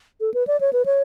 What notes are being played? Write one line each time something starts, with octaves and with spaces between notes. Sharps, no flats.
A4
B4
D5
C#5
B4
C#5